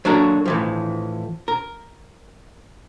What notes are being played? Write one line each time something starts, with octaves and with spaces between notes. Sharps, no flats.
F#3 A#3 D4 F#4 A4 A#4
A2 E3 F3
A#4